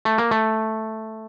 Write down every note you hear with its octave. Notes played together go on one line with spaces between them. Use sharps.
A3
A#3
A3